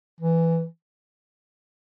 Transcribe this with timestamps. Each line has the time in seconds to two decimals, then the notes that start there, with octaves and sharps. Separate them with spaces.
0.21 E3